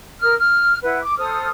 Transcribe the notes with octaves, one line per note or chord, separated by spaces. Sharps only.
A#4 D#6 F6
F6
E4 B4 F#5
D6
A4 C5 D#6 F6